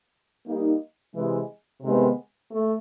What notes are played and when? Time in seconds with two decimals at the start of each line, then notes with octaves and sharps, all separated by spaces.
0.47 G3 A#3 D#4
1.15 C3 E3 G#3
1.82 C3 D#3 G#3 B3
2.50 A3